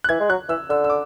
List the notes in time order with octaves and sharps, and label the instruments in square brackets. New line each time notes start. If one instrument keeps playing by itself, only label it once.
[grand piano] F#6
[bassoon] E3 [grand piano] G#6
[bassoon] G#3
[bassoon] F#3 [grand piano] F#6
[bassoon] E3 [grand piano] E6
[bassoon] D3 [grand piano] E6
[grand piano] E6
D6